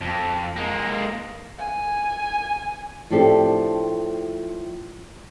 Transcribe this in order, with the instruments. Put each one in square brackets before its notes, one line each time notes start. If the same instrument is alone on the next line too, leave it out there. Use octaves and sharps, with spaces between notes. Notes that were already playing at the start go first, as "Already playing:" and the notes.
[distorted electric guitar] F2
G#3 A#3
[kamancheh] G#5
[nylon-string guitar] A2 F3 C4 D4 G4 A4